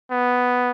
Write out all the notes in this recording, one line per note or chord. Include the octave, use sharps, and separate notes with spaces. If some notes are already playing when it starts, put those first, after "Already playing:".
B3